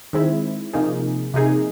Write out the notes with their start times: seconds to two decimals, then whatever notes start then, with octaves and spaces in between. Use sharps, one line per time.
0.13 D#3 G#3 C4 E4
0.73 C3 F3 A#3 D#4 G#4
1.34 C3 F3 A#3 D#4 G#4